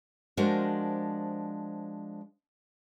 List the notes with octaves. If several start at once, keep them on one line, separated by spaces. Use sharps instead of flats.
F3 G#3 D4 F#4 A#4 C5